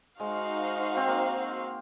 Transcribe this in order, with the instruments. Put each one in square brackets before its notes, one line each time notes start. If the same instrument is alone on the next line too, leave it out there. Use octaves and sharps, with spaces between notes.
[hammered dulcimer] G#3 [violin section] D#4 F#4 C5 F5
[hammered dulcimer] C4
A#3